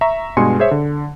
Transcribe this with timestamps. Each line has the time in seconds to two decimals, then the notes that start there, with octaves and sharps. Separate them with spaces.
0.01 E5 A#5 C#6
0.37 G2 B2 G#3 G#5 C6 C#7
0.60 G#4 C5 C#5 E5
0.71 D3